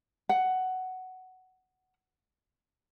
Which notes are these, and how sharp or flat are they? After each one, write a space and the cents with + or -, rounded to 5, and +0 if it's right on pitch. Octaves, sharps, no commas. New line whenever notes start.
F#5 +10